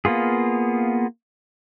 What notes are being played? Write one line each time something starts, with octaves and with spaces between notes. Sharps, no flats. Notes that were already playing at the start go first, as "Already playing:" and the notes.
A#3 B3 F4 G#4